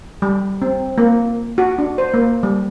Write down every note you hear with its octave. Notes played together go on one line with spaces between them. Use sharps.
G3
C4
A#3
F#4
D4
C5
A#3
G3